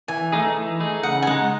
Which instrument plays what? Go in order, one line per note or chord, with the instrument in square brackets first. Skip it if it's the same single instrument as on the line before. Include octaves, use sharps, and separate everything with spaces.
[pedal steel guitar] E3 [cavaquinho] G#5
[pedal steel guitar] A3 D#4 G#4
E3
A3 D#4 G#4
[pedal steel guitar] C#3 [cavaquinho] F#5
[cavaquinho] G#5
[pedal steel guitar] G#3 D#4 [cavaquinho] F#5